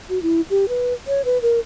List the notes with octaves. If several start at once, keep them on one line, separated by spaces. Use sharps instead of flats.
F#4
E4
G4
B4
C#5
B4
A#4